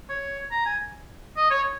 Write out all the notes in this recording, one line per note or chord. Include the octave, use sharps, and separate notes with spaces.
C#5
A#5
G#5
D#5
C#5